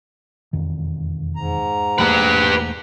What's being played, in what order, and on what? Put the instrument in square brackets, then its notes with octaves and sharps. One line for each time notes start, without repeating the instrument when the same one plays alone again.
[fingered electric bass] E1 F2 D#3
[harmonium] G#2 A#5
[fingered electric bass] E1 A3 A#3 [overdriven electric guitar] G4 B4